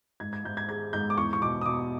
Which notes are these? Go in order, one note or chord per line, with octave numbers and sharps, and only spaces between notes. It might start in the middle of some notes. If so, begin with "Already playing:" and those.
G#2 G#6
G#6
G#2 G6
G#6
G#3 G#6
G#2 G6
D6
E2 C#6
C#6
B2 D6
D#6
B2 D6